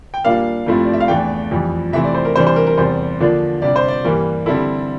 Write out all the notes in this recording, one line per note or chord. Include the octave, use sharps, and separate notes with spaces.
G5
A#2 G3 A#3 D4 F5
G2 F3 A3 C4 E4
D5
E5
F5
E2 E3 A3 D4 G5
F2 E3 G3
C3 E3 A3 C4 E4 E5
D5
C5
A#4
C3 E3 G3 D4 C5
C5
A#4
A#4
E2 C3 G3 C5
D3 F3 A#3 D4
C3 G3 D4 D5
C5
D5
G2 E3 G3 A#3
D3 G3 C4 E4 A4